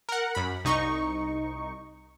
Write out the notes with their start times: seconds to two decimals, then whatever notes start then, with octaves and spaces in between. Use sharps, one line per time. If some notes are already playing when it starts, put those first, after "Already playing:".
0.09 A#4 F#5
0.35 F#2 B5
0.65 C2 D#4 C#6